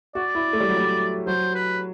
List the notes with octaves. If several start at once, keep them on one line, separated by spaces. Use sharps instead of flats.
F#4 D5
E4
A3
G3
F#3
G3
F#3 C5
B4